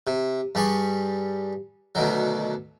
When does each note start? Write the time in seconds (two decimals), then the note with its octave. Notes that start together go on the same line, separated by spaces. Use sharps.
0.07 C3
0.55 G2 G3 G#4 C#6
1.95 D2 B2 D#3 F#3